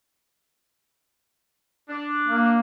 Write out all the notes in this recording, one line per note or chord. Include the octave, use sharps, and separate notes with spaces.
D4
A#3